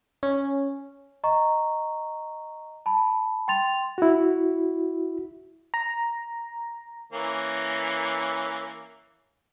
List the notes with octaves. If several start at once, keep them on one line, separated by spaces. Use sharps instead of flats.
C#4
D#5 A#5 C#6
A5 B5
G5 C6 A6 F7
E4 F#4
A#5
E3 A#3 C#4